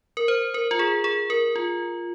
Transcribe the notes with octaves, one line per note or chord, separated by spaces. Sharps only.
A#4
C5
A#4
F4
G#4
G#4
A#4
F4